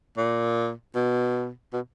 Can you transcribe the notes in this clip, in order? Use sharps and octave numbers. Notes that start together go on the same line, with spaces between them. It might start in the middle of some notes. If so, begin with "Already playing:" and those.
A#2
B2
B2